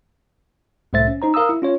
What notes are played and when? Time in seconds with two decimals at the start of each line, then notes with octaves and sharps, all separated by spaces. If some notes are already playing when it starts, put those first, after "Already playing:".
0.93 C2 A2 A3 C5 E5 A6
1.08 C#4
1.22 D#4 C5 A#5
1.34 A#4 F5 A#5 D#6 E6
1.49 E4
1.62 C#4 F4 C#5